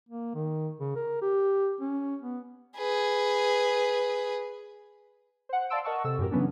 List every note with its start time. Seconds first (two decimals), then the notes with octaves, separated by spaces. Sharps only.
0.09 A#3
0.35 D#3
0.80 C#3
0.96 A#4
1.22 G4
1.81 C#4
2.22 B3
2.77 G#4 B4
5.49 C5 F#5
5.70 D5 F5 A5 C6 E6 D7
5.84 A#4 D#5 F#5 A5 C#6 E6
6.04 C3 A4 E6
6.18 F#2 A2 G4 A#4
6.31 C#3 E3 F#3 B3 C#4 D4